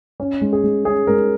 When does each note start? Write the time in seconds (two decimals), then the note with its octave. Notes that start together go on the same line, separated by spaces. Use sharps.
0.20 C#4
0.41 G#3
0.53 G#4
0.64 G#3
0.85 C#4 G#4
1.07 G#3 A#4